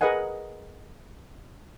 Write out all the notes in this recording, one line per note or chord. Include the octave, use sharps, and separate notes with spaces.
G#4 A#4 B4 D#5 F#5 G#5